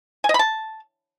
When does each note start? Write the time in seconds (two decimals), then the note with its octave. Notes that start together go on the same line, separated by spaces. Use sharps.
0.24 G#5
0.29 D#5
0.34 B5
0.39 A5